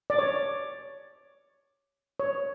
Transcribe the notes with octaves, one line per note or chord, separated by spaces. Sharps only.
D5
C#5
C#5